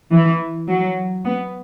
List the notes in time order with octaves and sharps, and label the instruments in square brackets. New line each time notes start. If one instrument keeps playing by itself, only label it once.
[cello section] E3
F#3
B3